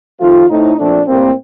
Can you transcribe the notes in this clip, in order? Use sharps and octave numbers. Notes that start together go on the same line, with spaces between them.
F2 D#3 A3 C4 F4
A2 A3 C4 D#4
A#2 F3 A3 C4 D4
A2 G3 A#3 C4